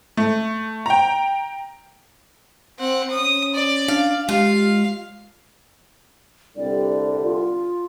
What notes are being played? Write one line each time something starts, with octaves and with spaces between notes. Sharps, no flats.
A3
G5 A#5
C4 F#5
C#4 D#6
D5
D4 F5
G#3 F4 G4 F5
C2 D3 G3 D5
F4